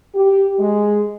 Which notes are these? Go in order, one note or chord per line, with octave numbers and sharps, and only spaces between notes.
G4
G#3